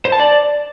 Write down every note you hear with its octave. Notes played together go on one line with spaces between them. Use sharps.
C5
A5
D5